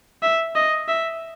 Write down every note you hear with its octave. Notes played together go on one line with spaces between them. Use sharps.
E5
D#5
E5